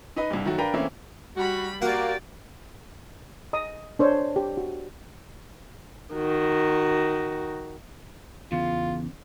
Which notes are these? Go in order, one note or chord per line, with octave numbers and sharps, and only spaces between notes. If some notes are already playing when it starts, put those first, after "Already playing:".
D#4 B4 D#5
C2 G2
D#3 F#3 A3 F#4
D4 A#4 B4 F5 G5 A#5
E3 A3 A#3 C4 C#4 E4
G3 F#4 B5
A#3 F#4 G4 D5
D#5 A#5 D#6
D4 C5 C#5
G4
F#4
D#3 F#4
E2 C#3 F4